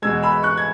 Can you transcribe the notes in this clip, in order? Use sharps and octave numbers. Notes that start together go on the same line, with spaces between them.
E2 B2 G#3 E6 G#6
B5 E6
C#6 F#6
G#6